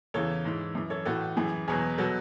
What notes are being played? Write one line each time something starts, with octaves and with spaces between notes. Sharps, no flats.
E2 C#3 E3 A4 C#5
G#2 E3
F#2 E3
A4 C#5
A2 E3 F#4 A4
F#2 E3 G#4
E2 B2 F#3 G#4
B2 F#3 F#4 A4